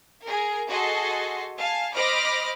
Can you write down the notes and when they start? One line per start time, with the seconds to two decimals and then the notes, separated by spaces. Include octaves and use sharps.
0.25 G#4 A#4
0.69 F#4 G#4 A4 D#5 C6
1.59 F5 G#5 A5
1.94 C5 D#5 B5 D6 F6 A#6